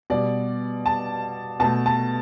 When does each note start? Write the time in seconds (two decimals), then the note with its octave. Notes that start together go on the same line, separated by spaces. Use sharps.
0.10 B2 G3 D5
0.86 A5
1.60 B2 A3 A5
1.86 A5